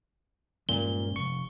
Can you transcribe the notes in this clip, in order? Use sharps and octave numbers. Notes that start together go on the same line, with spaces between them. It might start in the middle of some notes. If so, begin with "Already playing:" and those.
G2 A#2 G#3 C#4 G7
F1 C#6